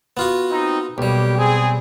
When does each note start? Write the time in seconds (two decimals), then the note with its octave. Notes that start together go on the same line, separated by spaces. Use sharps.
0.17 B3 F4 F#4
0.50 C4 D#4
0.98 B1 G3 A#3 G4
1.37 C4 G#4